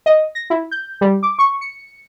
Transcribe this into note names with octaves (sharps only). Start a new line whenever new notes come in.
D#5
A#6
E4
G6
G3
D6
C#6
C#7